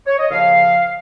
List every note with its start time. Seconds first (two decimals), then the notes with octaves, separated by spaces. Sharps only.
0.07 C#5
0.19 D#5
0.30 D#2 C#3 F3 F5